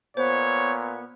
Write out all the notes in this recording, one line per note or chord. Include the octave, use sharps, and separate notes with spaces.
A#2 B3 C5 C#5